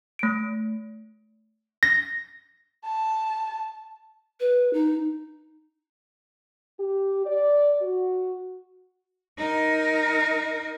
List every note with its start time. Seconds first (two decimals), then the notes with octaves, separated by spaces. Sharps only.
0.19 A3 D7
1.83 A#6
2.85 A5
4.40 B4
4.73 D#4
6.80 G4
7.25 D5
7.82 F#4
9.38 D#4 A#4